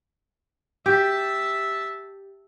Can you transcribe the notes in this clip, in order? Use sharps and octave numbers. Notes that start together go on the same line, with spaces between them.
G4 E5 A5